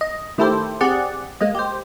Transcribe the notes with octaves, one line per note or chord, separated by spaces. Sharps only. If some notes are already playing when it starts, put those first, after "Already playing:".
D#5
D#3 A3 E4 G4 A4 C5
C4 G4 G#4 D5 F#5
G#3 A#3 D#5
G4 C5